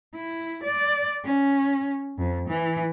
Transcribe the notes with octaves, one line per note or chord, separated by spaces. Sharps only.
E4
D5
C#4
F2
E3